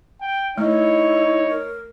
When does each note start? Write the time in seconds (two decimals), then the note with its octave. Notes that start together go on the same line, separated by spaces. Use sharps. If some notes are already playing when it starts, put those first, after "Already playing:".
0.21 G5
0.58 A3 D#4 E4 C#5
1.49 A#4